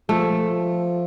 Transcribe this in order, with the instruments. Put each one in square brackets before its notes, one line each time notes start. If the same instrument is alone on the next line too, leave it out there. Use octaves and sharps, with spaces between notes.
[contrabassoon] F3 [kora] A3